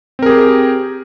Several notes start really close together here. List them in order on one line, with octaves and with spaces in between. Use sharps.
C4 A#4 G#4 G4